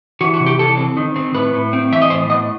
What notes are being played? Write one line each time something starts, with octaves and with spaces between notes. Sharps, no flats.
E3 F#4
F#4
C3
G4
E3 A4
C4
D#3
C4
A2 B4
A2
C4
E3 E5
D#5
A2 C5
B3 D#5